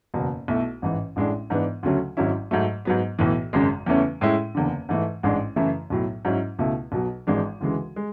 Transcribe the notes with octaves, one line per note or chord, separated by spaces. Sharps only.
F#1 E2 B2
B1 B2 A3 E4
A1 G#2 E3
A1 A2 G#3 D4
G#2 E3 B3 D4
D2 C#3 F#3 A3 C#4
G#1 G#2 F#3 C#4 E4
G#2 F#3 A3
G#2 F#3 B3
B1 A2 E3
G#1 F#2 C#3 G#3
E2 C#3 E3 A3 C#4
A2 G#3 C#4 E4
F#1 E2 D3
G#2 E3 A3
A1 G#2 G#3 D4
F#2 C#3 E3 A3 E4
B1 A2 F#3
G#2 F#3 C#4 E4
C#2 B2 A3 E4
B1 B2 F#3
G#1 G#2 E3 G#3 D4
D2 C#3 E3 G#3
G#3